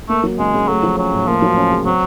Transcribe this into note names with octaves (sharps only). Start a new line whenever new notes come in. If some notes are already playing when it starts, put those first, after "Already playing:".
A3 A#3
F#3
C#3 G#3
C#3
F#3 A3
F3
F#3 C#4
A2
F3 A#3
F#3
C#4
C#3
F#3 C4